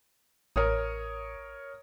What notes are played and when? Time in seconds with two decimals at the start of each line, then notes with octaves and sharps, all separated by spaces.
0.56 A1 A#4 C#5 D#6